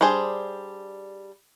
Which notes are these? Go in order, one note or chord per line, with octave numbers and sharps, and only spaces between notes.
G3 D4 G#4 C5